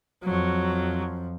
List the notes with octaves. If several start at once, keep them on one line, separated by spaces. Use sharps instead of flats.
F2 F3 F#3